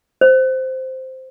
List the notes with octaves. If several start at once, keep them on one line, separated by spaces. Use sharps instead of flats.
C5